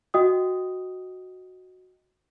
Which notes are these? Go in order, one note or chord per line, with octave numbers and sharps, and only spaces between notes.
F#4 D#5 G5 D#6